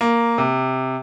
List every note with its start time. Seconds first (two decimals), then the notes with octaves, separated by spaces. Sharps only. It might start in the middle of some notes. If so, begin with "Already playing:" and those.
0.01 A#3
0.38 C3